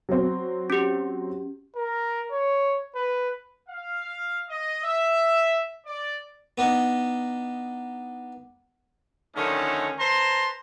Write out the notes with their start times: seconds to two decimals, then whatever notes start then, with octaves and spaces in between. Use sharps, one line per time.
0.09 F#3 C4
0.70 C#4 G4
1.76 A#4
2.32 C#5
2.95 B4
3.69 F5
4.49 D#5
4.83 E5
5.86 D5
6.58 B3 D4 D#4
9.36 D3 D#3 F3 A3 C#4 D#4
9.99 B4 C5 A5 A#5 C6